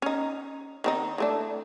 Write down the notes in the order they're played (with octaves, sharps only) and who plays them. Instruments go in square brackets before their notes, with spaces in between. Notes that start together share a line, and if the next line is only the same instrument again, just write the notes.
[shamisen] C#4 D#4
D#3 C4 D#4
E3 A3 D4